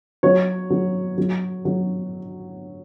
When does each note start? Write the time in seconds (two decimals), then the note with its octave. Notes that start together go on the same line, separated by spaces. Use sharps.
0.23 F#3 C#5
0.70 F#3
1.18 F#3
1.65 F#3